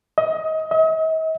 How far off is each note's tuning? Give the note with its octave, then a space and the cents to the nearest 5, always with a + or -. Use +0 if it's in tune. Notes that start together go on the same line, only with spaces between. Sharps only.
D#5 +25
D#5 +45